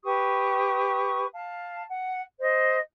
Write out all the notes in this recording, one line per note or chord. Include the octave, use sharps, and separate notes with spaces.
G4 B4 C#6 D#6
F5 A5
F#5
C5 D#5